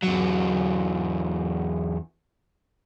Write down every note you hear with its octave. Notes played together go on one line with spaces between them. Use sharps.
E2 F#3